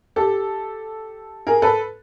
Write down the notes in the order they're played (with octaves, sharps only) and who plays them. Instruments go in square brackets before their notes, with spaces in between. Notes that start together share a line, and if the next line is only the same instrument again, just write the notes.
[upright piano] G4 A4
G#4 A#4
A4 B4